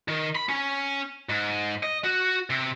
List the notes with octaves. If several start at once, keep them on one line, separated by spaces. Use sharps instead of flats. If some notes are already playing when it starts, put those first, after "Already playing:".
D#3
B5
C#4
G#2
D#5
F#4
C3